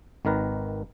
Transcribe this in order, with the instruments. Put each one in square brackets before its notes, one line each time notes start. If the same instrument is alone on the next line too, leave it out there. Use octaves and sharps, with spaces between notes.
[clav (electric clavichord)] G#1 D#3 A#4 B4